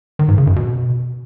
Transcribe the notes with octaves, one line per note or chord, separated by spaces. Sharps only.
D#3
G#2
C#3
F#2
B2